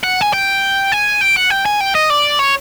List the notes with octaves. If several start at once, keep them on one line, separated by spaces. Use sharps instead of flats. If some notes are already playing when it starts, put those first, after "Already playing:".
F#5
G#5
G5
G#5
G5
F#5
G5
G#5
G5
D#5
D5
C#5